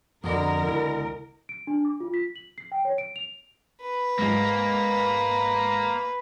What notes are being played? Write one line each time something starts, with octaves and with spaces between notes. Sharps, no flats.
F2 B2 D3 A#4
C#2 E4 G#5
D7
D4
D6
F4
B6
F#7
C7
G5
C#5
D7
F7
B4
G#2 G#3 A#3